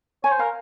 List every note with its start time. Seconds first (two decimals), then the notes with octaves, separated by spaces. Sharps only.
0.24 C#5 G#5
0.32 C5
0.39 A#4 F5